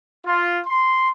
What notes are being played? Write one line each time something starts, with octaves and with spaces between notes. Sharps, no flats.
F4
C6